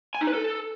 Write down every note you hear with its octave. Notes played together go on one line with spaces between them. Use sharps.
G#5
D#4
B4
A4